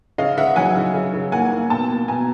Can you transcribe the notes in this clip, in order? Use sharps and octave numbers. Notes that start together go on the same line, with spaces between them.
C#3 D#5 F5
C#3 E5 F#5
F#3 F#5 G#5
C#3
C#3
C#3
A#3 F#5 G#5
A#3
B2 G5 A5
A#3
B2 G#5 A#5